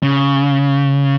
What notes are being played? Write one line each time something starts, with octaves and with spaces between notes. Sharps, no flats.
C#3